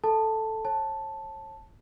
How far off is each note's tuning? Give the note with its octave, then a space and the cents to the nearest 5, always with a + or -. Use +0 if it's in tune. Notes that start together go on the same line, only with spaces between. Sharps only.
A4 +0 A5 +5
C#5 -40 A5 +0